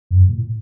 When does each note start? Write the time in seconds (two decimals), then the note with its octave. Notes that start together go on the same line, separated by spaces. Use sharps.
0.11 F#2
0.29 A#2
0.35 A2